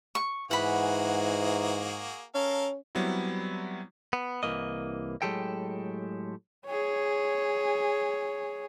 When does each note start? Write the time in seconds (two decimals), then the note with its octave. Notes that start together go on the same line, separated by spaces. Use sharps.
0.15 C#6
0.51 G#2 E3 A#3 F#4 G#4 F#5 B5
2.35 C#4 A4 A#4 F5
2.95 F#3 G3 B3 C4 E4
4.13 B3
4.43 C2 F2 E3 A#3 D#5
5.22 A2 F#3 G#3 G4 A4 G5
6.67 G#4 C#5